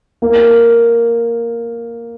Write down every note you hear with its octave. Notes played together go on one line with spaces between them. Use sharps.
A#3